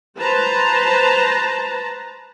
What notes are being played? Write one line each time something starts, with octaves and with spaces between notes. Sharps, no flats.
B4 C5 A5 A#5